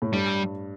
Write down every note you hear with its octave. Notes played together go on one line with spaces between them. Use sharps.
A2
G2 G3